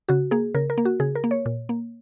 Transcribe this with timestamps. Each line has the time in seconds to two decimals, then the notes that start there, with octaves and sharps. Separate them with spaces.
0.09 C#3 F#4
0.31 A#3 G#4
0.54 C#3 A#4
0.70 A#4
0.78 A#3
0.85 F#4
1.00 C#3 G#4
1.15 A#4
1.24 A#3
1.31 C#5
1.46 A#2
1.69 A#3